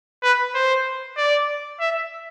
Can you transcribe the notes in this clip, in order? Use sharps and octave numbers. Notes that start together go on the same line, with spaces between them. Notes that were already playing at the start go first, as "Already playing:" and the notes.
B4
C5
D5
E5